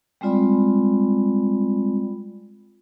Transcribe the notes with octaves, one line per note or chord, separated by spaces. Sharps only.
G3 G#3 C4 F4 D5 B5